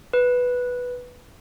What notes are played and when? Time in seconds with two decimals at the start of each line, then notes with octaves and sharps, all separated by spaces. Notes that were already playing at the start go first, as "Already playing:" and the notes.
0.13 B4